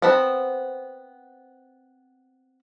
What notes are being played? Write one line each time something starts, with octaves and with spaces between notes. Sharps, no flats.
B3 C4 F#5 A5 B5